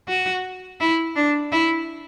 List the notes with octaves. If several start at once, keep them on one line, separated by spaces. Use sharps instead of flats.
F#4
E4
D4
E4